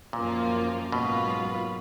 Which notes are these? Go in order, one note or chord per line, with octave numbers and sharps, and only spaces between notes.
F#2 A#2 F3 A#3 F4
G#2 B2 F#3 A#3 F4 B4